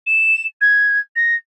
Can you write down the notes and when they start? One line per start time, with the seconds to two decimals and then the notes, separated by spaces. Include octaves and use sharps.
0.06 E7
0.61 G#6
1.15 A#6